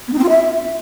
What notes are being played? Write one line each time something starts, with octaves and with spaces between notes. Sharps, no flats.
B3
D#4
C4
F4
E5